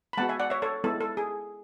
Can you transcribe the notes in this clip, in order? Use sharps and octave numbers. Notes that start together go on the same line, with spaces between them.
B5
G#3 B3 F#4 F#5 A5
E5 G#5
D5 F#5
C#5 E5
A4 C#5
G#3 B3 E4 A4
A4
G#4